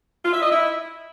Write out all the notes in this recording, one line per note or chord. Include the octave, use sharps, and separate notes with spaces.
F4
E5
D#5
E4